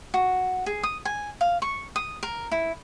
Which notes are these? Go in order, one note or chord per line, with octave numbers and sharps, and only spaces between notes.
F#4
G#4
D#6
G#5
F5
C#6
D#6
A#4
E4